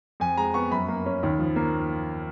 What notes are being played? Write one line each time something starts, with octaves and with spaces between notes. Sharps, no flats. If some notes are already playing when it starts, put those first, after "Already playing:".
F2 G#5
G#3 A#5
B3 C#6
F#2 B5
A#3
C#4
D#2
F3
A#3